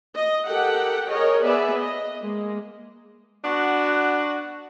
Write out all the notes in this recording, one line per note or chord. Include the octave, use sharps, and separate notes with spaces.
D#5
G4 A4 A#4 F#5 G5
G#4 A#4 C#5 D#5
B3 G#4 B4 D5 E5
D#5
G#3 A#3
B3 D4 F#4